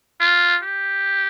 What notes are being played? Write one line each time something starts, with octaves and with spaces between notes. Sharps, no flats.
F4
G4